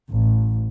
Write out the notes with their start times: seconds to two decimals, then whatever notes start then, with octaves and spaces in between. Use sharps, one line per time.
0.11 A1